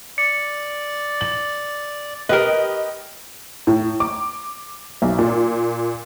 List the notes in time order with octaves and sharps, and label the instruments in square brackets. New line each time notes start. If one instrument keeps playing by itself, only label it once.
[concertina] D5 [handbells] C#7
[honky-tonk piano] F#7
[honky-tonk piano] G4 D#5 [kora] A#4 B4
[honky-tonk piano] A2
D6
B1
A#2